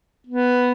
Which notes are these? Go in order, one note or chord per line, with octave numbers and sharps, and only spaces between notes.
B3